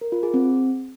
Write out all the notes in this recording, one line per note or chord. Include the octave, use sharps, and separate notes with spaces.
A#4
F4
G#4
C4